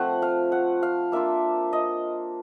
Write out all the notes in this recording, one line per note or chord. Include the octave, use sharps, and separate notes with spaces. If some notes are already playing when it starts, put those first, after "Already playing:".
Already playing: F3 A3 C4 F#5
F5
F#5
F5
A#3 D4 F4 E5
D#5